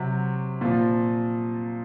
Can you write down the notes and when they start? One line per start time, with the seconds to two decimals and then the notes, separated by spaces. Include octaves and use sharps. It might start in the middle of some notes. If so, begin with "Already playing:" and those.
Already playing: C3 F#3
0.61 A#2 F3